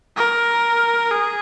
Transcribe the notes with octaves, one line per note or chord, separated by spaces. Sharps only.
A#4
G#4